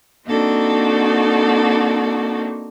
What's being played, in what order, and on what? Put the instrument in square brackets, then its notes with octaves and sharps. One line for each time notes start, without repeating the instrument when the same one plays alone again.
[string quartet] A#3 C4 D4 D#4 F#4 A4